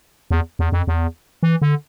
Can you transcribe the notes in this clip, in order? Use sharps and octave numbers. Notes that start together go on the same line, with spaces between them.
E2
E2
F2
E2
E3
D3